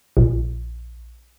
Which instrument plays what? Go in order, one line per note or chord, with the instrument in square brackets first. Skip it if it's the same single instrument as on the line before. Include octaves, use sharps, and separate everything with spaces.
[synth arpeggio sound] A#1